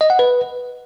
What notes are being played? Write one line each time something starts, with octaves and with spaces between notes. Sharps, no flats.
D#5
F#5
B4